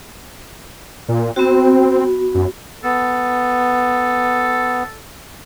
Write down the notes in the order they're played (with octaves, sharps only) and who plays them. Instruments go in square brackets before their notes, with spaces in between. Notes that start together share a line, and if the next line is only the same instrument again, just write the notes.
[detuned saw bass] A#2
[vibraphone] B3 F#4 [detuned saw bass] C4
[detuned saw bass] F#2
[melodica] B3 [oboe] A4